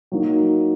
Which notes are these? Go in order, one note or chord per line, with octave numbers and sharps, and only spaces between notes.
F#3 A#3 D#4